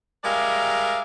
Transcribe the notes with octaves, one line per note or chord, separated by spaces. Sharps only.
G3 G#3 A#4 D5 E5 F5